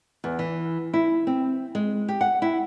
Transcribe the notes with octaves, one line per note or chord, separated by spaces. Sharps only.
E2
E3
E4
C4
G#3
G4
F#5
E4